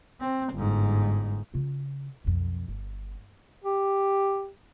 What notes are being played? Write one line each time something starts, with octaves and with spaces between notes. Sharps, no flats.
C4
G1 G#2
C#3 F4
B1 F2
G1
G4